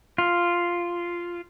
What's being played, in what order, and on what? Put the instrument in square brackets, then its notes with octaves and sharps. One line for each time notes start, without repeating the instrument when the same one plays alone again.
[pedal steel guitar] F4